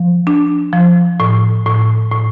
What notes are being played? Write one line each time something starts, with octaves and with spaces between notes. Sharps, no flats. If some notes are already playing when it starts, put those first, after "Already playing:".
Already playing: F3
D4
F3
A2
A2
A2